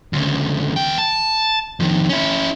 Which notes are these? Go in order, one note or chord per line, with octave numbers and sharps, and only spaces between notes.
D2 C#3
E2 G5
A5
F2 D#3
C#4 E4